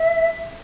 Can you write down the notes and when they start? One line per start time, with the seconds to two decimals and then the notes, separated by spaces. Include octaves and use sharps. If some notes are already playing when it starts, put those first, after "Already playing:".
Already playing: E5